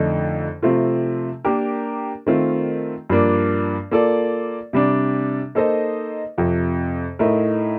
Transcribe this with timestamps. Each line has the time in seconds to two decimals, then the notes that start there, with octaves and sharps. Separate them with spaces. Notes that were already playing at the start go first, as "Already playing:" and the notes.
Already playing: F2 D3 A3 D#4 A4
0.63 C3 F3 A3 C4 F4
1.45 A#3 D4 G4 A#4
2.27 D#3 A3 C4 F4
3.10 G2 F3 A#3 D4
3.91 A#3 F4 A4 D5
4.73 C3 G3 D4
5.55 A#3 D#4 A4 C5 D#5
6.38 F2 C3 F3
7.19 A2 A3 D#4 A#4